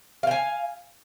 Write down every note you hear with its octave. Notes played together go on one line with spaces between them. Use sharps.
F5 G5 G#5